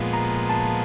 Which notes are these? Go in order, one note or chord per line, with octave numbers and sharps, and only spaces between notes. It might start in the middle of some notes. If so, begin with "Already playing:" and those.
Already playing: A#2 F3 G#3 B3
A#5
A5